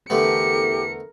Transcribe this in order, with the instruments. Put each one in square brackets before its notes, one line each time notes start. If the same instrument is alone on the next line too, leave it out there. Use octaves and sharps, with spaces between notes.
[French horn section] E2 A4 [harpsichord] D3 A3 B3 [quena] G4 [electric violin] A#4 C#7